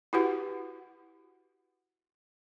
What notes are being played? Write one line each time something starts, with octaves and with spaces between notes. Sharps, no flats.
E4 F#4 G4 B4 F#5